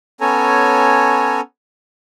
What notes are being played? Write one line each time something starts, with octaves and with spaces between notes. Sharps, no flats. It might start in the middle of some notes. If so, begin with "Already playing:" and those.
B3 C#4 A4 C#5 G#5 A#5